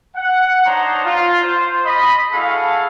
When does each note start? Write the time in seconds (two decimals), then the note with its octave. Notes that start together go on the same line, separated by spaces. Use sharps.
0.16 F#5
0.65 D4 D#4 C5 C#5 A#5
1.05 F4
1.42 C5
1.85 D#5 B5
2.32 A3 E4 F#4 G#4 A4 F5